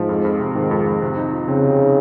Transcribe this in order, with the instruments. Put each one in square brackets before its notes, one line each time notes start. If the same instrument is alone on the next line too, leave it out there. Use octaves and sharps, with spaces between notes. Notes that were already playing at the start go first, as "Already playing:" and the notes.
Already playing: [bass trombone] G#2 [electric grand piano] F3
[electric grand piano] F2
F2
C3
[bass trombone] G#2 [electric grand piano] D#3
[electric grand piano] F2
F2
C3
D#4
F3
[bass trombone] C#3 [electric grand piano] C4
[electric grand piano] C3
D#4